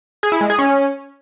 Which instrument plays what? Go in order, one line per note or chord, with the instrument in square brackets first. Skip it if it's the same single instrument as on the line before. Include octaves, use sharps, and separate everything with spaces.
[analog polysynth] G#4
E4
G#3
G#4
C#4